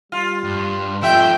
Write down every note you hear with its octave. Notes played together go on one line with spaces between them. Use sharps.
G3 F4
G2
F3 A3 E5 G5